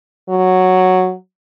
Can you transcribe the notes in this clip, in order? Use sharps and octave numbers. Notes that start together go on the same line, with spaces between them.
F#3